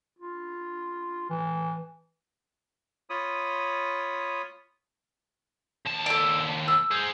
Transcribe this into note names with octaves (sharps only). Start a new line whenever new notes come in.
F4
E3
F4 C#5 B5 D#6
D#2 A5
A4 D5
E6
G#4 C5